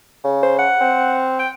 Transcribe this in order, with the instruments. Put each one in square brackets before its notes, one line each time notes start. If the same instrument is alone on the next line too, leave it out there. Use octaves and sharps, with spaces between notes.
[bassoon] C#3
[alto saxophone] C5
F#5
[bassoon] C4
[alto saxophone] G5